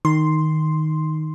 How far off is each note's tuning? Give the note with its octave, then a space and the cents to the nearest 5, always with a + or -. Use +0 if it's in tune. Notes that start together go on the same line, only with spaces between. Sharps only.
D#3 +0 C6 +0